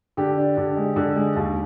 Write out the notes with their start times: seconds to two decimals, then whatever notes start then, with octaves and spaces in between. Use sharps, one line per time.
0.17 D3 G4
0.37 D4
0.57 D3
0.77 G#3
0.96 D3
1.16 G#3
1.36 D#2